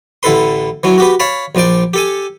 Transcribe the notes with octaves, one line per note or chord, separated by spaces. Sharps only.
A1 D3 E4 A4 B4 C6
E3 F#3 C#4
F#4 G4 B4
C#5 F5 A5 B5
A#1 F3 D4 D5 G5
G4 A4 G#5